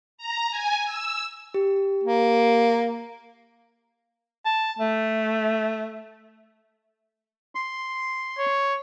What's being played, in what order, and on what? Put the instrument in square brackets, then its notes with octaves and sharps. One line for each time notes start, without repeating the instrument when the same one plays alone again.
[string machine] A#5
G#5
E6
[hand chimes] G4
[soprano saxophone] A#3
[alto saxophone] A5
A3
[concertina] C6
[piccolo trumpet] C#5